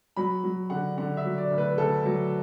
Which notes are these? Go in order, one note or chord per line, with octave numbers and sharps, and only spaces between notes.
F#3 B5
F#3
D3 F#5
D3 F#5
E5
F#3
D5
D2
B4
D2 A4
F#3